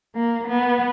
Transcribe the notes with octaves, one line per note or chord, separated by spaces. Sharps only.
A#3
B3